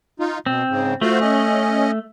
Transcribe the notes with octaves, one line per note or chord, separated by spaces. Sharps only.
D#4 F4
B2 C4
G#2 C#3
A3 F4 F#4 C5
C#4 D#5